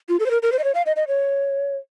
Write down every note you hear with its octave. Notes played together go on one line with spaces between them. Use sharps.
F4
A4
C5
A#4
A#4
C5
D#5
C#5
F5
D#5
D#5
C#5